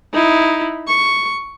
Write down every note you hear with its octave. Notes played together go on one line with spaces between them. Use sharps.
D#4 E4
C#6